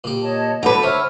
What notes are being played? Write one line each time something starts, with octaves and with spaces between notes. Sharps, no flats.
A#2 G4
C#5 D#5 A5
D2 A4 B4 F#5 A5 A#5 D6
C5 C#5 E5 E6 F6